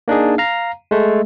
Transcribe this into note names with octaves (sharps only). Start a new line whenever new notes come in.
A#3 D4 D#4 G#4
F5 A#5
G#3 A3